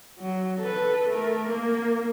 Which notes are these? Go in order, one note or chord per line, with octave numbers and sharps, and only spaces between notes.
F#3
A4 B4
A3 A#4
A#3